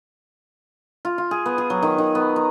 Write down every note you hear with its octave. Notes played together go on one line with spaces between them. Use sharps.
F4
F4
G#4
B3
G#4
F#3
D#3
D#3
B3
A#5